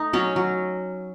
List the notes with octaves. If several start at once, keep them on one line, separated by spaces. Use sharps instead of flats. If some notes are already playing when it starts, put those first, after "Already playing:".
Already playing: A3 D#4
F#3 C#4
F#3